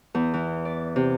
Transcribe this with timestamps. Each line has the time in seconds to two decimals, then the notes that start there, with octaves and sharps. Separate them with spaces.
0.15 E2
0.34 E3
0.65 D5
0.96 C3